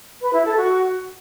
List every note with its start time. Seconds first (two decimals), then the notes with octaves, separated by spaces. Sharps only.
0.21 B4
0.33 E4
0.45 A4
0.57 F#4